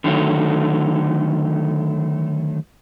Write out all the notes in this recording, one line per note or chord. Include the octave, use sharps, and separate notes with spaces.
D3 D#3 F#3 A3